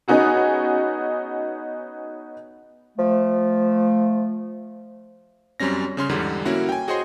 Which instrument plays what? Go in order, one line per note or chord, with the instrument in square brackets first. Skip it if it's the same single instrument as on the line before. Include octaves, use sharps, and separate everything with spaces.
[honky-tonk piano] B3 C#4 D#4 F#4 G#4
[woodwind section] F3 A3
[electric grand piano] F#2 G3 C4 C#4 A#6
C#3 C#4 C6 F6
E2 G#2 D3 G3
A#3 C#4 E4 F#4 F#5
G5 G#5
F#4 G#4 C5 C#5 D#5 C6